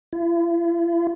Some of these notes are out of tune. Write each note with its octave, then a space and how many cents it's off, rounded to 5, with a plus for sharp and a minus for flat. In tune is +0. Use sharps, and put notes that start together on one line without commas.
E4 +45